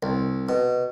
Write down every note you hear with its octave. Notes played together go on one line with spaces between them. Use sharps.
C2
B2